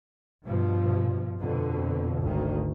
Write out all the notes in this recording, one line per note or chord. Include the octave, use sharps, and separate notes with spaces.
G2 B2 F3
F2 B2 D3
G#1 D2 D#3